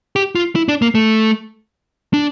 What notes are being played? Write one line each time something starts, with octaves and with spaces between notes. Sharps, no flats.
G4
F4
E4
D4
A#3
A3
D4